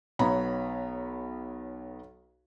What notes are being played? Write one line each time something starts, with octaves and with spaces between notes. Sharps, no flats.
B1 B3 C#5 A#5 B5